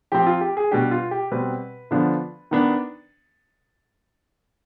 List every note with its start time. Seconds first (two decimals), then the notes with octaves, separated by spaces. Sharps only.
0.12 F3 C4 G4
0.27 F4
0.41 G4
0.57 G#4
0.71 B2 G3 D4 G4
0.91 F4
1.11 G4
1.31 B2 G3 C4 B4
1.91 D3 F3 B3 D4
2.51 D#3 B3 D4